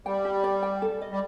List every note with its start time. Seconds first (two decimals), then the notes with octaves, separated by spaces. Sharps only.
0.06 G3 G5
0.25 G4
0.44 D5
0.63 G5
0.82 A4
1.02 D#5
1.12 G3